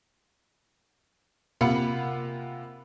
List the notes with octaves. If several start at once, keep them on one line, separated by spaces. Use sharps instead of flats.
C3 A#3 F4 F#5 B5 C#7